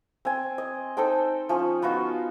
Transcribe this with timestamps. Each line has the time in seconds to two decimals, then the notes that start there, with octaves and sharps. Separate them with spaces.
0.25 C4 G#5
0.58 D#5
0.97 D#4 A4 C5 G5
1.49 F3 C#4
1.82 B3 D#4 F4 F#4